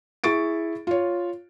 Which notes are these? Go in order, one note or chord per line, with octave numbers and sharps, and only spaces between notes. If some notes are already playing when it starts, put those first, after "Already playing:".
E4 G#4 C#6 A6 D7
F4 C#5